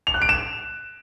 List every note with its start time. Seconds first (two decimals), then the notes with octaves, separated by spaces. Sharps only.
0.07 F7
0.14 F#6
0.22 D7
0.29 E7